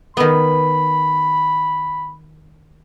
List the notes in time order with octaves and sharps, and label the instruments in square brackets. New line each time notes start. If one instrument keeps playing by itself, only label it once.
[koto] D#3 B3 [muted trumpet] B5